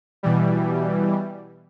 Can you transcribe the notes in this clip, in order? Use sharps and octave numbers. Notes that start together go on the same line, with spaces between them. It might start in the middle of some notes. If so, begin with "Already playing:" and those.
B2 E3 G3